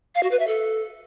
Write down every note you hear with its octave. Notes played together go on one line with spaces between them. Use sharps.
F5
F#4
B4
E5
A4